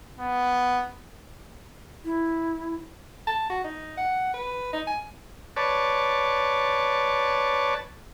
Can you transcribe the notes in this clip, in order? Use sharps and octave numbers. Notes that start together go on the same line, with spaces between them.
B3
E4
A5
F#4
D#4
F#5
B4
D#4
G#5
B4 C#5 D5 A5